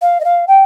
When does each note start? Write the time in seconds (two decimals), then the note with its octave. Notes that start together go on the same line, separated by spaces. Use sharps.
0.02 F5
0.20 D#5
0.25 F5
0.48 G5